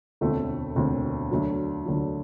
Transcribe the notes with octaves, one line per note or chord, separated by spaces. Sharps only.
E1 D2 D3 A3 C4
E1 D2 D3 A3 C4
D2 D3 F#3
D2 D3 F#3